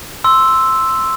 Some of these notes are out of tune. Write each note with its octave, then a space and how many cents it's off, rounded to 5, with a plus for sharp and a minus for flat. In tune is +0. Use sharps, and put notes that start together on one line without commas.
C6 +0 E6 +0